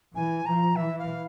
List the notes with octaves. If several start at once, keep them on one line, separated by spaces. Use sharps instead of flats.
E3 G#5
F3 A#5
E3 E5
F5